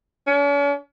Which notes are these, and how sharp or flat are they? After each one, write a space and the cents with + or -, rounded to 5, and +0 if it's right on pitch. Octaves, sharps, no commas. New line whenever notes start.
C#4 +45